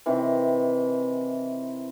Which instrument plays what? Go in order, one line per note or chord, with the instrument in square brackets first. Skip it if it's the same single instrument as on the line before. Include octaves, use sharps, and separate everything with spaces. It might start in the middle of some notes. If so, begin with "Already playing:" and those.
[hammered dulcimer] C3 D#3 E3